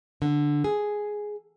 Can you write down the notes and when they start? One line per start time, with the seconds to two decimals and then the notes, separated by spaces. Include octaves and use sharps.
0.22 D3
0.64 G#4